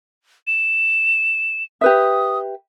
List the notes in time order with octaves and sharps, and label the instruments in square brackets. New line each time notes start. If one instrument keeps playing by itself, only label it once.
[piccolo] E7
[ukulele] G4 B4 E5 [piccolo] D#6